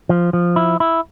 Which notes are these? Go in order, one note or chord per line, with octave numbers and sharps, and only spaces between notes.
F3
F3
E4
E4